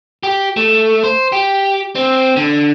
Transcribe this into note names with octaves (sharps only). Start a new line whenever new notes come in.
G4
A3
C5
G4
C4
D3